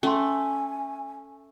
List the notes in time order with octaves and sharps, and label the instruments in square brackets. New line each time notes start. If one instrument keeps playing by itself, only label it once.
[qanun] A3 [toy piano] C#4 C6 [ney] G#5